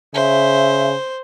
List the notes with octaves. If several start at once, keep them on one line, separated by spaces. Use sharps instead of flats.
C#3 C5 E5